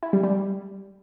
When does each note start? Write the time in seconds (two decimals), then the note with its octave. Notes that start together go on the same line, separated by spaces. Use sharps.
0.03 E4
0.13 G3
0.24 G3